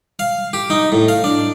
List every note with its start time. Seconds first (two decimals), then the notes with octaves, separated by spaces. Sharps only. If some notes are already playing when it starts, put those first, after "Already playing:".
0.19 F5
0.53 G4
0.70 D#4
0.92 A2
1.08 F5
1.24 D4